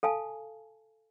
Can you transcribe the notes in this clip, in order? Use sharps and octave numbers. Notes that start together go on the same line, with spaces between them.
A4 F5 G#5 A5